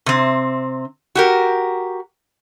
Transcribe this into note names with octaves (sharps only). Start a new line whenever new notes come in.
C3 C4
F#4 G4 A#4